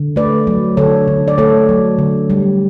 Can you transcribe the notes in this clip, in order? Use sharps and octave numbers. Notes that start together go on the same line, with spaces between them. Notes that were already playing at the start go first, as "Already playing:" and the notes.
Already playing: D3
A3 B4 D5
F#3
D3 A4 C#5
D3
D5
A3 A4 C#5
F#3
D3
G3